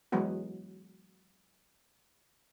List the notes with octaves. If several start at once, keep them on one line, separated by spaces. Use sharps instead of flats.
E3 F#3 G#3 B3 F#4